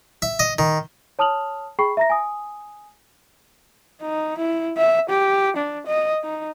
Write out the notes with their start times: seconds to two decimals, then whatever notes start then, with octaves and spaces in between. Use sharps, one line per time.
0.22 E5
0.39 D#5
0.59 D#3
1.19 C#5 A5 D#6 F6 F7 F#7
1.79 G#4 G5 B5 C#6 C7
1.97 E5 A#5 A#6
2.10 G#5 D#6
4.01 D#4
4.38 E4
4.78 E5
5.10 G4
5.57 D4
5.86 D#5
6.24 D#4